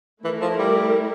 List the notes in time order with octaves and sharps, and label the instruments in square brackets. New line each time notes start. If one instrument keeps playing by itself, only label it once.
[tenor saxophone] E3 [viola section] A3 E4 A#4
[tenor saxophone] F3
G3